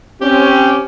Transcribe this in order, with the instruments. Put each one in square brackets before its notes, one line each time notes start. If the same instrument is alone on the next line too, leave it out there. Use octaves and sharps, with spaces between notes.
[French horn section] C4 C#4 [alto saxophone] G4